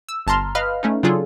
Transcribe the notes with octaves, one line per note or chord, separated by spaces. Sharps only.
E6
G1 A5 A#5 C6 F6
B4 D#5 F5 B5 F6
A3 C#4 D#4
C#3 F#3 D4 F4 G#4 A4